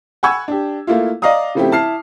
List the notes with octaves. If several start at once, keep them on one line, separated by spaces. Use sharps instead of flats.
F#5 G#5 B5 C#6 E6 G#6
D4 G4
A3 A#3 E4 F4
D5 D#5 F5 A#5 D#6
C#3 F3 A3 C4 E4 G4
E4 A5 F6 C7